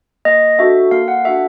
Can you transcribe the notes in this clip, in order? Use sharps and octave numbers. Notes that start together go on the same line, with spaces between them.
A#3 D#5
D4 F#4 A4 E5
A#3 F5
F#5
D4 F#4 A4 E5